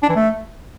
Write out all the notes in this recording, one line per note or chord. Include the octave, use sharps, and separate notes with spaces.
D4
E3
A3